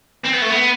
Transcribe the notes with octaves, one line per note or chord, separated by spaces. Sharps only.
C4
B3
A3
B3